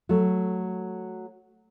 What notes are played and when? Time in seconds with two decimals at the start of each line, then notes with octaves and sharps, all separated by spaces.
0.09 F#3 A3